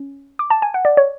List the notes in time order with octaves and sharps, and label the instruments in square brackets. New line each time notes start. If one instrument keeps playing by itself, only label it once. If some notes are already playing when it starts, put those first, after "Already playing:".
Already playing: [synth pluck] C#4
D6
A5
G#5
F#5
D5
C#5